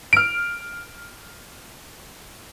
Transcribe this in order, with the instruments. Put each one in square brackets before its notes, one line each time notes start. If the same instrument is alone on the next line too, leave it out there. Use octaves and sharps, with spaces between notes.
[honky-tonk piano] F6 D7